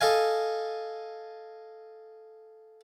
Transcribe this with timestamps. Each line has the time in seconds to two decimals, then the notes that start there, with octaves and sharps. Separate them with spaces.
0.01 A4 D#5 F5 G#5